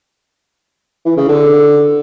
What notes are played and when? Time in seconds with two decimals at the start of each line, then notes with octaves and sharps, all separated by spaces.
1.05 E3
1.17 C#3
1.29 D3